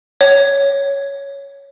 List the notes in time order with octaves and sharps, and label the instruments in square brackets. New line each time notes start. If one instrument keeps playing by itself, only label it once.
[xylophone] C#5